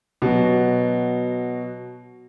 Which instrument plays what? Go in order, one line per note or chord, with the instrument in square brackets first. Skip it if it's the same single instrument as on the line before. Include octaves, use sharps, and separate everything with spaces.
[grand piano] B2 F#3